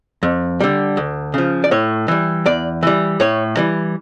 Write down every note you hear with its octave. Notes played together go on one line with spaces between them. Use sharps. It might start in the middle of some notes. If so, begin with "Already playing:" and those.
F2
D3 G3
D2
C#3 F3
D5
A2 C#5
E3 G3
E2 D5
E3 G3
A2 C#5
E3 G3